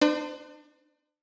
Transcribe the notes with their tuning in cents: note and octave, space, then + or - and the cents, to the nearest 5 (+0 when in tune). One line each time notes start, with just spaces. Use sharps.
D4 +35 C5 -30